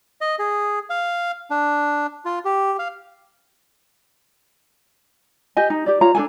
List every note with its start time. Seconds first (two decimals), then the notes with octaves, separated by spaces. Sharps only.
0.21 D#5
0.39 G#4
0.90 F5
1.51 D4
2.25 F4
2.45 G4
2.79 F5
5.57 G4 D#5 G#5
5.70 D#4
5.86 G4 D5
6.01 F4 C#5 A#5
6.15 D4 F4 A4 G#5